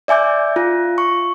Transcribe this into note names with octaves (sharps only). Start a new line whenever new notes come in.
D5 E5 G#5 D6 G6
F4
C#6